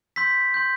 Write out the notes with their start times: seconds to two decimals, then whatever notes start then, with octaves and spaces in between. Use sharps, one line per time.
0.16 C6 E6 G6 B6
0.54 C6 G6